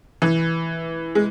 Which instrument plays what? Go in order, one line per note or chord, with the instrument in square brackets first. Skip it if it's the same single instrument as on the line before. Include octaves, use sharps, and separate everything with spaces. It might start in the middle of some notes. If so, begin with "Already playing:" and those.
[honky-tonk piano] E3
G#3